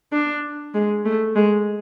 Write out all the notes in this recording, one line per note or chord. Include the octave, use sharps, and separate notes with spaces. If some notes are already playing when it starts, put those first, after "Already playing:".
D4
G#3
A3
G#3